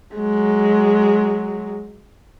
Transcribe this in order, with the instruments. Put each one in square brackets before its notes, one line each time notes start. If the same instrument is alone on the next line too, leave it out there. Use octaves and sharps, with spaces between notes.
[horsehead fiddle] F#3 G#3